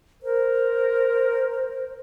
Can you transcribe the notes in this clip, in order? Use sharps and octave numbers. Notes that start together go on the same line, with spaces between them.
A#4 C5